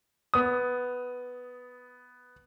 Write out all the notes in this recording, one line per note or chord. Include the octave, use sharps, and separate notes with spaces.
B3 D#6